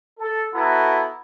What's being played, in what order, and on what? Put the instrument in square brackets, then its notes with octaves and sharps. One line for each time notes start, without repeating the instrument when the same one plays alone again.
[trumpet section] A4
B3 E4 F#4 A4 A#5